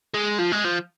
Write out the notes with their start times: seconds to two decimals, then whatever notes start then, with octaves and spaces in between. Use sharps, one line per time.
0.14 G#3
0.39 F3
0.52 G#3
0.64 F3